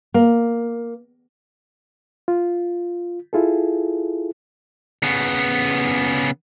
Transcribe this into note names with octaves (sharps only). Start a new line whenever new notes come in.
A#3
F4
E4 F4 G#4 A4
C#3 B3